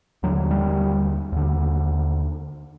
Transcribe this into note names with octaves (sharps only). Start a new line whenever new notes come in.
D#2 D3 F#3
G3
D#2 D3